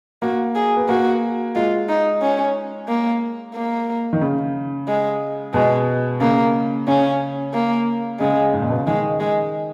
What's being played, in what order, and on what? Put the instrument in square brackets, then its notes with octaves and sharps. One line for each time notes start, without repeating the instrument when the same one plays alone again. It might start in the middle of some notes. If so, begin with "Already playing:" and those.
[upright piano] A#3 [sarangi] F#4
[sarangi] G#4
[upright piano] B3
[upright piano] A#3 [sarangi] F#4
[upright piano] G#3 [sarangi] F4
[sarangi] D#4
C#4
A#3
A#3
[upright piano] D#3
C#3
[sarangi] G#3
[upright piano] B2 [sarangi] G#3
[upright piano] C#3 [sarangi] A#3
[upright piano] C#3 [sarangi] C#4
[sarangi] A#3
[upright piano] C#3 [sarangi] G#3
[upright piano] G#2
A#2
B2
C#3
[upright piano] D#3 [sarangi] G#3
[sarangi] G#3